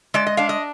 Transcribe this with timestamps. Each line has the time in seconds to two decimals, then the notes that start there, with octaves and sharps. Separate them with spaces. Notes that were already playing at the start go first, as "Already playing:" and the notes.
0.14 G#3 D5
0.27 D#5
0.37 D4 F5
0.49 D#5